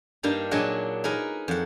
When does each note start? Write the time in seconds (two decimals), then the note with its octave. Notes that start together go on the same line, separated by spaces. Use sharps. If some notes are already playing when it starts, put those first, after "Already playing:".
0.23 G2 G3 A#3 D4 D#4
0.51 A#2 F#3 D4 G#4 D#5 F#5
1.04 D#4 G#4 A#4 B4
1.48 F2 F#5